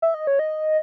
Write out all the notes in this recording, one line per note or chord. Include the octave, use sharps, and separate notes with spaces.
E5
D#5
C#5
D#5